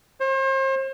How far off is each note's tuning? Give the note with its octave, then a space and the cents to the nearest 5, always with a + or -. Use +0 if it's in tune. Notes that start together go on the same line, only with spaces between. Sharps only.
C5 +40